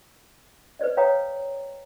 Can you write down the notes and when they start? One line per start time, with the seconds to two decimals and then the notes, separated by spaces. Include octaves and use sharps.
0.79 B4 C5 D5 D#5
0.97 B4 C#5 F5 G5 A#5 D#6